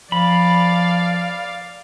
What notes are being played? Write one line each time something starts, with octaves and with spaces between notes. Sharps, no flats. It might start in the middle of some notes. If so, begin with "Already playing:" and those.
F3 D5 F5 B5